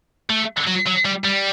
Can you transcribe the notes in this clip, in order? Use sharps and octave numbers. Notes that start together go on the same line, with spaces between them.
A3
F#3
F#3
G3
G3